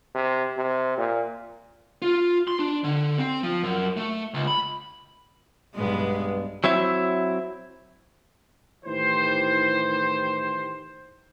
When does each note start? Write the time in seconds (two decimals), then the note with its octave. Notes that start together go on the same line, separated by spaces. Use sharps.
0.15 C3
0.57 C3
0.98 A#2
2.02 F4
2.48 C6
2.59 D4
2.84 D3
3.18 C4
3.43 F3
3.63 F#2
3.97 A3
4.34 C#2
4.47 B5
5.75 B1 G2 G#3 B3
6.64 F#3 C4 E4 E5
8.85 A2 D#3 E3 G4 C5